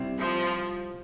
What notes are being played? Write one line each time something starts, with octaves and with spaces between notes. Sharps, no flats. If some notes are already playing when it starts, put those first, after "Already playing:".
Already playing: C3 G3 C4 E4
F3